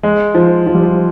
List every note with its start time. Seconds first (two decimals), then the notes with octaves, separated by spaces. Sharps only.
0.03 G#3
0.35 F3
0.66 F3
0.75 G3
0.83 F3